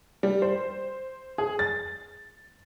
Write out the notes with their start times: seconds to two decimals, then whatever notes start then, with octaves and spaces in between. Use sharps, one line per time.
0.23 G3
0.42 C5
1.38 G#4
1.59 A6